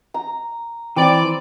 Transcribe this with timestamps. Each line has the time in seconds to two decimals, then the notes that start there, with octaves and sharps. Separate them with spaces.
0.14 A#5
0.96 E3 C4 D5